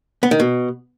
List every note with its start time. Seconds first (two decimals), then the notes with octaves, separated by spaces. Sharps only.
0.23 B3
0.31 D#3
0.40 B2